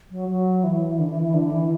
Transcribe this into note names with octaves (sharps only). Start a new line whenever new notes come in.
F#3
F#3
E3
D3
E3
E3
D3
E3